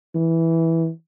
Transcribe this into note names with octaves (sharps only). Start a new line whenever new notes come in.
E3